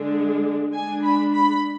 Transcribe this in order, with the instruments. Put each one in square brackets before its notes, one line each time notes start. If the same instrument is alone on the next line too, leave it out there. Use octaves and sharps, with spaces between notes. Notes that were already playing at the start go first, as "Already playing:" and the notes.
Already playing: [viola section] D3 G#3 D4
G#3 D4 G#5
B5
B5